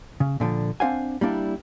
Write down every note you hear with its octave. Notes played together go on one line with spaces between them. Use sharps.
C#3
A#2 D3 F3
C4 D4 C5 F5 F#5 G#5
G3 A#3 D4 E4